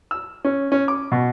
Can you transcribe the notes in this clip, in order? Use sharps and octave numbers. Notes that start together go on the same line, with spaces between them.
E6
C#4
C#4
D6
B2